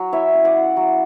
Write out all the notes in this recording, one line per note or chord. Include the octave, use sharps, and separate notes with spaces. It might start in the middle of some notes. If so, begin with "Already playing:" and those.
Already playing: F#3
E4 C#5 E5
C#4
D5 F#5
E4
F#3